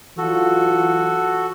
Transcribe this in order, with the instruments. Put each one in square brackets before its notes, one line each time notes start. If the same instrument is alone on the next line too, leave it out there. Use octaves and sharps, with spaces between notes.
[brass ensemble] E3 F#3 F4 [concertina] F#4 A4